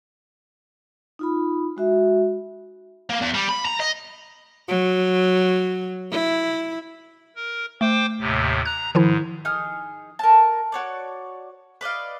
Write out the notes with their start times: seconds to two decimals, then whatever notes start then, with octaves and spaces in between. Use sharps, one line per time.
1.19 D#4 F4 B5
1.77 G#3 F#4 E5
3.09 A#3
3.21 E2
3.34 G3
3.49 B5
3.65 A#5
3.80 D#5
4.69 F#3
6.12 E4
7.36 A#4
7.81 A3 C5 G5 D6
8.20 D#2 A2 C3
8.65 A#5 F#6
8.95 G#2 D#3 F3 E4
9.45 D#4 G#4 D#6 F6
10.19 A#4 A5
10.72 F#4 C#5 D5
11.81 B4 D5 D#5 F5